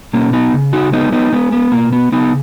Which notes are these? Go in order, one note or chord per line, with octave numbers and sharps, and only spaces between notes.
B2 A#3 C#4
B3 D#4
C#3
D#4 F#4
G#3 B3 D#4
B3 D#4
G#3 B3
B3
B2 A#3
B3
C#3 B3 D#4